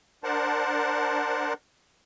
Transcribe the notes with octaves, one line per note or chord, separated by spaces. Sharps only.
D4 A#4 C5 F#5 A5